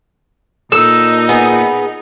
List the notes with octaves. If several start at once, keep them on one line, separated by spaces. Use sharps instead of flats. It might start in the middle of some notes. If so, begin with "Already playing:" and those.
A#2 D#4 A4 D#5 E6
B3 G#4